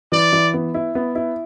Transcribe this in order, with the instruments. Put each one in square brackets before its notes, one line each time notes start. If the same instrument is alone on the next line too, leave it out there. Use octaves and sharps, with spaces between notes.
[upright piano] E3 [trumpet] D5
[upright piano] E3
B3
E4
B3
E4